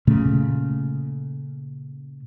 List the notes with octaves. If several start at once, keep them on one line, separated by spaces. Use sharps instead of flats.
A#2 C#3 A3